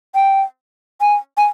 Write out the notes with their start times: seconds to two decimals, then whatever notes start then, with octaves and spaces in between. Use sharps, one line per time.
0.15 G5
1.01 G#5
1.37 G#5